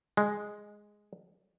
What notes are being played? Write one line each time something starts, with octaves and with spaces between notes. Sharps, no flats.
G#3